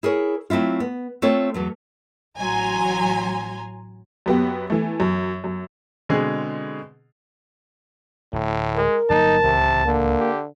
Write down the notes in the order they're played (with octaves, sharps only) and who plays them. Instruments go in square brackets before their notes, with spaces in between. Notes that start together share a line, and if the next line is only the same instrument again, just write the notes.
[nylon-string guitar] E4 G#4 A#4 C#5
F#3 A3 C4 E4 F4
B3
A3 C4 F4 A4 C#5
E2 F#3 A3
[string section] A1 F#3 G#5 A#5 C6
[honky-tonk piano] F#2 B3 G4
E3 A3
F#2
F#2
[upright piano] B2 D3 G#3 C4 G#4
[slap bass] D1 [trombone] A2
[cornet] G#3 [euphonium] A#4
[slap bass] G1 F#3 A#3 [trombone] D#4 [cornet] A5
[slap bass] D1 C#2 E3 [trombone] C3
[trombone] D3 [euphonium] A#3
[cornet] G4